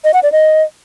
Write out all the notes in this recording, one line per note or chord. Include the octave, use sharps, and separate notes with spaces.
D#5
F#5
D5
D#5